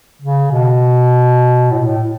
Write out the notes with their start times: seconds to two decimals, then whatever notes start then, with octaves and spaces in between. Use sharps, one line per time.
0.22 C#3
0.52 B2
1.71 A2
1.78 B2
1.87 A2